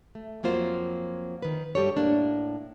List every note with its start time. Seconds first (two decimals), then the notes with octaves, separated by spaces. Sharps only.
0.15 A3
0.43 F2 F#3 A#3 F4 C5
1.42 D#3 B4
1.75 G2 G3 G4 A4 C#5
1.97 A2 A#3 D4